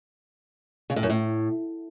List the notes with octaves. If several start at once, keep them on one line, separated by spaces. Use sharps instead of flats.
C#3
A2
F#2
A2